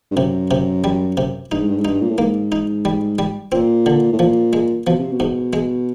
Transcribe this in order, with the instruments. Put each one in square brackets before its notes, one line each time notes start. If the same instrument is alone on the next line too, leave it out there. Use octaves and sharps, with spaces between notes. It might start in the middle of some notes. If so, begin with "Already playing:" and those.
[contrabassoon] G2
[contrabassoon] F#2 [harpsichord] C3
[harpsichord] C3
G3
C3
[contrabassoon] G2 [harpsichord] D#4
[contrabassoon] G#2
G2
G#2
[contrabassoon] G2 [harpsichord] D#4
[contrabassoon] A#2
A2
[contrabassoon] G#2 [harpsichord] A#3
[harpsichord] D#4
G3
G3
[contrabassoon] A#2 [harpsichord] C4
[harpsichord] D3
[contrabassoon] A2
[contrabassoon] A#2 [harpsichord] F3
[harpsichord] G#3
[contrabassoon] B2 [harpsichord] F3
[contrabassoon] C3
B2
[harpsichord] G#2
G#3